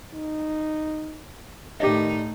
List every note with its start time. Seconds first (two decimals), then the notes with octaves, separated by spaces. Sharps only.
0.14 D#4
1.80 A2 D#3 D#4 G4 D5 D#5